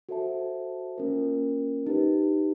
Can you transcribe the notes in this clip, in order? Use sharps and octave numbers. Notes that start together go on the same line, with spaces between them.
F#4 A4 C5 E5 A5
A#3 C#4 F4 A#4
D#4 G4 B4